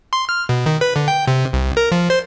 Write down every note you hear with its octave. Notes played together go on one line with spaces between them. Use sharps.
C6
F6
B2
D#3
B4
D3
G5
C3
C2
A#4
F3
C5